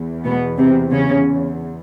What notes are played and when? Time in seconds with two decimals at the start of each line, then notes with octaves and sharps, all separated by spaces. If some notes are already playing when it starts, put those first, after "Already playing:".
Already playing: E2
0.24 B2 B3
0.58 C3 C4
0.91 C#3 C#4